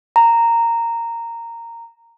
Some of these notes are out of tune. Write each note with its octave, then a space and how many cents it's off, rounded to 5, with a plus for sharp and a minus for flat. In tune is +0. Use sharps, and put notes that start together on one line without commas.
A#5 -10